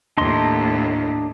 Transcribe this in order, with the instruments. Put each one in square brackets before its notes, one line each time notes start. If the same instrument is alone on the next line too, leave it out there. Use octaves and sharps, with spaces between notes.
[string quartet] D#2 A2 [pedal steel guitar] D4 D#5 C6